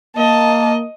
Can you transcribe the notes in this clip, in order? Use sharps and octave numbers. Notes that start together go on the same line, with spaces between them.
A#3 D#5 A5